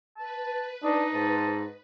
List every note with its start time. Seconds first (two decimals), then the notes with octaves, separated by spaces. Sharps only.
0.17 B4 A5
0.83 D4 D#4 D#5
1.14 G#2 A5